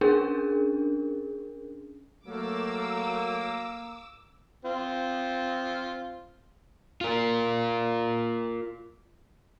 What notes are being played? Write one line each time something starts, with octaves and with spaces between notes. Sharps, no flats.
C#4 D4 G#4 A#4
F#3 A3 A#3 D6 E6
C4 F4
F4 A#4